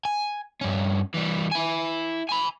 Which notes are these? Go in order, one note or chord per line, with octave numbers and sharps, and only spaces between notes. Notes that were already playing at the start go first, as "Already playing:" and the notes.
G#5
G2 C#4
E3 G3
E4 G#5
G#5 B5